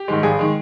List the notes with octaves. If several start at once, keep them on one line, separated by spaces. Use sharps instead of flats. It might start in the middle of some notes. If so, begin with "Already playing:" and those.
Already playing: G4
G#2 D#3 G#3
G#1 G#4
D#3 G#3